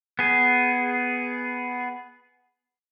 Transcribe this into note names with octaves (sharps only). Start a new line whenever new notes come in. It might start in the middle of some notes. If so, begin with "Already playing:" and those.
B3 G#4